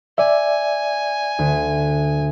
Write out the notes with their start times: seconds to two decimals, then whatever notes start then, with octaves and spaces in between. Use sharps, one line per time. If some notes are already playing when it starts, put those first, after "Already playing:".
0.18 D5 E5 G#5
1.39 D2